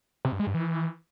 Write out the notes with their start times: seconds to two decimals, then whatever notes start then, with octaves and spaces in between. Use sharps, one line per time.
0.25 C3
0.32 G2
0.40 G#3
0.47 G2
0.54 E3